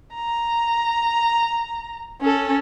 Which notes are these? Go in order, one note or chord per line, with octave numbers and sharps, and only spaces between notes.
A#5
C#4 A4